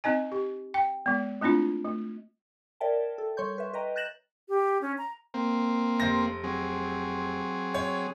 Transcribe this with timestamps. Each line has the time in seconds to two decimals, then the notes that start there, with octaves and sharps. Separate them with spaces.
0.04 C4 D#4 D#5 G#5
0.32 G4
0.74 G5
1.06 G#3 B3
1.41 A3 C4 D4 E4 F4
1.84 A3
2.80 A#4 C#5 D5 E5 G5 A5
3.18 A4
3.37 G3 C#5 C6 C#6 G6
3.58 B4 E5
3.73 B4 D#5 G5 A#5
3.96 F#6 G6 A6 A#6 E7 F#7
4.49 G4
4.81 C#4
4.98 A#5
5.34 A#3 C4
6.00 F1 C5 A#6
6.44 F#3 C4 G#4
7.74 C#5